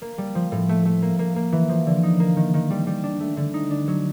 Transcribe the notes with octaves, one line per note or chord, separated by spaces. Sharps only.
A#3
G3
F3
A2
A3
A3
A#3
A#3
A#3
E3
F3
D3
D#4
A#3
D#3
D#3
G3
G3
D4
A3
D3
D#4
D4
F#3